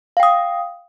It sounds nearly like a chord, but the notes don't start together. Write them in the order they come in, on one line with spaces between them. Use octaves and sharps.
F5 G5 D#6